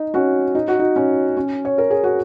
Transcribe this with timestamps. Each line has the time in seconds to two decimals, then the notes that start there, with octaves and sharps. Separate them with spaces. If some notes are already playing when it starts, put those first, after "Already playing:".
Already playing: D#4
0.14 C#4 F#4
0.55 D#4
0.68 F#4
0.79 D#4
0.96 C#4
1.37 C#4
1.65 C#5
1.78 A#4
1.91 G#4
2.04 F#4